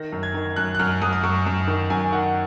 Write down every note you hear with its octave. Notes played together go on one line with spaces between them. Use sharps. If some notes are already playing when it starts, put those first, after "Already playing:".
Already playing: D#3 A#6
F#2
G#6
D#3
F#2 F#6
F#6
F#2 F6
F#2 D#6
D#6
F#2 C#6
F#2
D#3
F#2 G#5
D#3 F#5